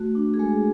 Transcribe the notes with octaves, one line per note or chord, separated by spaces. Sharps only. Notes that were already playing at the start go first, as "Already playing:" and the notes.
Already playing: A3 F#4
D4
G#4
G#3 A4